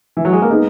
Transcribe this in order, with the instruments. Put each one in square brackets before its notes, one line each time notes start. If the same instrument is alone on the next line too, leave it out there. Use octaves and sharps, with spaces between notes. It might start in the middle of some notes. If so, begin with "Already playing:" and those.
[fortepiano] E3
F#3
G#3
A#3
[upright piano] G#3 D#4 [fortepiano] B3